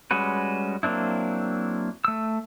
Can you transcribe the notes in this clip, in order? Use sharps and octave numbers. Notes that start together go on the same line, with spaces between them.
G3 G#3 C#4 F#4 B4
F#3 A#3 C4 D4 E4
A3 E6